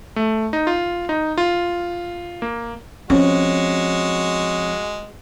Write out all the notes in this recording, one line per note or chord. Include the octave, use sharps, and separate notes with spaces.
A3
D#4
F4
D#4
F4
A#3
F3 G#3 C4 C#4 F#4 C#5